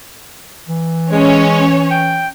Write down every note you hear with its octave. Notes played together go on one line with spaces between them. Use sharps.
E3
G#3 C#4 C#5
G5